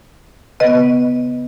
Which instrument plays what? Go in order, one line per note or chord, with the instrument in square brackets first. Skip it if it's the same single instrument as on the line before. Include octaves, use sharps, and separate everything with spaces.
[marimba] C#3 B3 B4 D#5